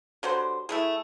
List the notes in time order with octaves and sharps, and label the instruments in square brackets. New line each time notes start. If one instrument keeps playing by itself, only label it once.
[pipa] D3 F#3 G3 C5
A3 E4 G#4